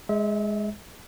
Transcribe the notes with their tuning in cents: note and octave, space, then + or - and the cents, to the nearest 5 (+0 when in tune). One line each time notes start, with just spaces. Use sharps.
G#3 +0 E5 -30